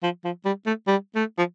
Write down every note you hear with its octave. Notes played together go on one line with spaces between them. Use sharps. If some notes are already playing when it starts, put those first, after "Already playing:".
F3
F3
G3
A3
G3
A3
F3